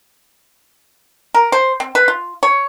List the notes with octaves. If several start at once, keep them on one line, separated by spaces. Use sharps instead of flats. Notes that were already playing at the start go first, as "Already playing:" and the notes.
A#4
C5
C4
B4
F4
C#5